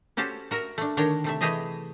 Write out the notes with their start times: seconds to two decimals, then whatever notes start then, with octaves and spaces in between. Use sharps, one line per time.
0.17 C#4 F#4 G4 A4 C5 A5
0.51 F#4 A#4 E5
0.78 A3 D4
0.97 D3 D#3 D4 C#5 G5 A#5
1.24 C3 A3 E5
1.41 E3 A3 G4 G#4 D#5 E5